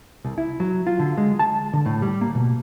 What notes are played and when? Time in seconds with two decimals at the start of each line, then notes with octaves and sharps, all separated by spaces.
0.25 C2
0.38 E4
0.60 F#3
0.87 F4
0.99 D3
1.17 G#3
1.39 A5
1.73 D3
1.86 A2
2.02 G3
2.21 A#3
2.35 B2